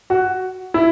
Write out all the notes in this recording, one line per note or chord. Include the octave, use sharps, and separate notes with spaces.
F#4
E4